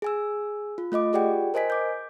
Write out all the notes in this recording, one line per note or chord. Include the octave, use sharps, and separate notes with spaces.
G#4 G#5 E6
F4
A3 F4 D#5 D6
F4 G4 G#4 D5 F#5 G5
A#4 C5 D#5 G#5 B6
D6 G6